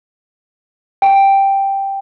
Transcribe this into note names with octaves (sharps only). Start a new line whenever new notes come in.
G5